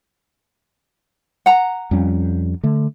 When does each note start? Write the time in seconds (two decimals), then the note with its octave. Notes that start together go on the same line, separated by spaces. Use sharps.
1.46 F#5 A#5
1.91 F2 G3 C#4
2.63 D3 A3